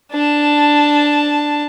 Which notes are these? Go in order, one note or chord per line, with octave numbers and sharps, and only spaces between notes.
D4 A5